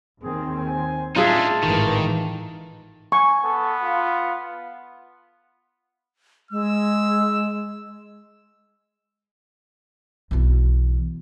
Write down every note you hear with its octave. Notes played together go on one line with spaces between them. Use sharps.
D#2 D#3 C4 G#4
C5 G#5
A2 D4 D#4 F4 G#4 E5 A5
G#1 A2 D#3 E3
G#5 C#6
B3 A4
F4
G#3 E6
B1 E3